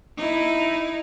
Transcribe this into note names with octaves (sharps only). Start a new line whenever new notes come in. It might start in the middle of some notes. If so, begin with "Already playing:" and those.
D#4 E4